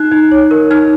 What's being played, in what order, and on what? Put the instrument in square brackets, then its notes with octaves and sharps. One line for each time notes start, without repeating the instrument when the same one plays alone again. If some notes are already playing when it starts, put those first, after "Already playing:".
Already playing: [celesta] D#4 F#6
D#4
C#5
A#4
D#4 F6